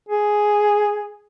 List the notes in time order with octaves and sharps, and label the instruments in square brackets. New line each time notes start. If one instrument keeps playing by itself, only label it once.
[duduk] G#4